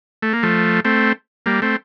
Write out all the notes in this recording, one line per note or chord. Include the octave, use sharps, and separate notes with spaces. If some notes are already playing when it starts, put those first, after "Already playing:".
A3
A#3
F3 A3
A3 C4
G3 A#3
A3 C4